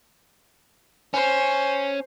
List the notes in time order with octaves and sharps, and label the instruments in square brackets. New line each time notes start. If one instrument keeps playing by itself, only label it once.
[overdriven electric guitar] C#4 [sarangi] C5